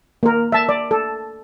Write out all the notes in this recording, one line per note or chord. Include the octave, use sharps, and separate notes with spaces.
A#3 A#4
E5 A5
D5
A4